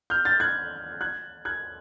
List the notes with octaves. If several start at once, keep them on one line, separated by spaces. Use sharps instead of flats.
F6 G6
G6 A6
F#6 G#6
F#6 G#6
F#6 G#6